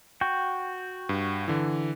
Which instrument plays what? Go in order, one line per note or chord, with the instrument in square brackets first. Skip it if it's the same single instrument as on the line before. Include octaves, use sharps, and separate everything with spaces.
[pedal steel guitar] F#4 G5
[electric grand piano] G2
D3 E3